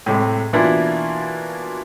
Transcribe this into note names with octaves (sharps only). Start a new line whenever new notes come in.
A2 C3 G#3
B2 E3 A#3 D4 E4 F4